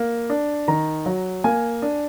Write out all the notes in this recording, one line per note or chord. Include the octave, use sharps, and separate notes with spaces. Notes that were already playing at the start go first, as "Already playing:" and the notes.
Already playing: A#3
D4
D#3 A#5
F#3
A#3 G#5
D4